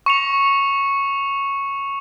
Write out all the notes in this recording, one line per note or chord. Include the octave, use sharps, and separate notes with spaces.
C#6 C#7 F7